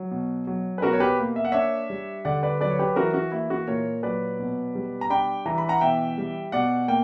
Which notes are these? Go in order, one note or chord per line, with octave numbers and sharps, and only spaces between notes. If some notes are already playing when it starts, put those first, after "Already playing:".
Already playing: F#3
B2
F#3
B4
B2 F#4 A#4
C#5
G4 B4
A#3
E5
F#5
D4 C#5 E5
G3
D3 D5 F#5
B4 D5
F#3 B4 D5
C#5
G4 B4
E3 F#4 A#4
F#4
A#3 E4
F#4
A#2 A#4 C#5
F#3 B4 D5
B2
G3
A#5
D4 G5 B5
E3 A#5
B5
F#5 A#5
B2 E5 G5
G3
B2 D5 F#5
A#3 G5